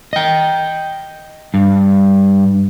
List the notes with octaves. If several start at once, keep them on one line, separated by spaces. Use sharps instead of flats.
D#5 G5
G2